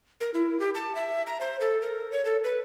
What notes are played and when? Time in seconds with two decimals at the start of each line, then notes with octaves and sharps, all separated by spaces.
0.21 A#4
0.34 E4
0.60 G4
0.75 A5
0.95 E5
1.27 A#5
1.41 C5
1.61 A4
1.82 A#4
2.12 C#5
2.25 A4
2.44 B4